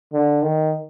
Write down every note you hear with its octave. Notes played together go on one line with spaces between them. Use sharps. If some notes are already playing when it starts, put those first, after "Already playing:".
D3
D#3